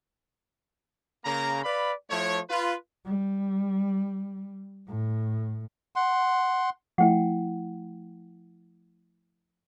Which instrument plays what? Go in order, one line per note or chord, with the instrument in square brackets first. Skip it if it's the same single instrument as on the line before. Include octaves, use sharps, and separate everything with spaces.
[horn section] C#3 A#3 A#5
B4 D5 F5 B5
F3 A3 E4 C#5
F4 B4
[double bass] G3
A2
[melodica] F#5 C6
[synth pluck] F3 A3 E4 [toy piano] F#5 G5